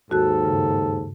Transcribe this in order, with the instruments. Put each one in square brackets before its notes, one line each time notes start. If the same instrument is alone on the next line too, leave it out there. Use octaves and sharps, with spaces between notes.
[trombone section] D#2 G#2 A4 [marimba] F#4 F#6
[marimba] G2 C#3